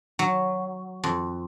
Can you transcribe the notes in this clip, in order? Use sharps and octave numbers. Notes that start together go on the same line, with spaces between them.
F#3
F2